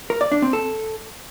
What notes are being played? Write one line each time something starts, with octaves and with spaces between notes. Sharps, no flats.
A#4
D5
D4
C4
A4